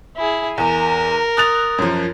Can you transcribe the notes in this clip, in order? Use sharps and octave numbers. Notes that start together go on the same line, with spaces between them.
E4 G#4
E2 A#4 G#5
D#6 F#6 A6 F7
F#2 F3